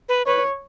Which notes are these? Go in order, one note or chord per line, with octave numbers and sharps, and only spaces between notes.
B4
B4 C#5